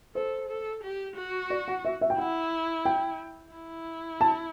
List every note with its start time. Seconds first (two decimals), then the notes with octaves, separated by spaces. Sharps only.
0.15 A4 C5
0.49 A4
0.83 G4
1.16 F#4
1.50 D5
1.68 F#5
1.85 E5
2.01 E5
2.10 G5
2.18 E4 F#5
2.85 G5
3.53 E4
4.21 A5